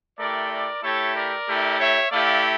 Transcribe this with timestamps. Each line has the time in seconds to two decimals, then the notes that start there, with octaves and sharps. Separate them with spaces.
0.18 A3 E4 G4 A#4 D5
0.50 A#4 D5
0.82 A3 E4 G4 A4 C#5
1.15 A#4 D5
1.47 A3 E4 G4
1.79 C#5 E5
2.11 A3 E4 G4 D5 F5